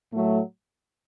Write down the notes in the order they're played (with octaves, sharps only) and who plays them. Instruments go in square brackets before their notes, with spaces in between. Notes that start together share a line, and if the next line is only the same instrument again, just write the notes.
[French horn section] A2 F#3 A3